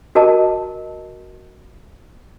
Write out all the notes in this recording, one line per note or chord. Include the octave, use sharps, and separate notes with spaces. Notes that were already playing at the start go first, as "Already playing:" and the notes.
F#4 A#4 D#5 A5